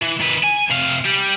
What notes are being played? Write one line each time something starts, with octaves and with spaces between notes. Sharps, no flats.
E3
D#3 B4
G#5
C3 F5
G3 G4